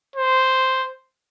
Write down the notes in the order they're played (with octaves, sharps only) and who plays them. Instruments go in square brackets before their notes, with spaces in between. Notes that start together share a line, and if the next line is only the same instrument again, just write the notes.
[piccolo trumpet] C5